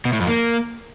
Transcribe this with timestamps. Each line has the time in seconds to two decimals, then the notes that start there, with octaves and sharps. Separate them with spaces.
0.05 B2
0.13 A2
0.20 F2
0.27 A#3